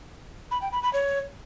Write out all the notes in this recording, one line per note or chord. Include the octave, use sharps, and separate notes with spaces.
B5
G5
B5
B5
C#5